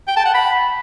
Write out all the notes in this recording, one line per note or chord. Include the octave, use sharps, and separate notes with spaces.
G5
A5
F#5
B5